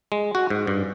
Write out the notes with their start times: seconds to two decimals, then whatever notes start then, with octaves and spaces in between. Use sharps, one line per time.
0.12 G#3
0.35 F#4
0.50 G#2
0.67 G2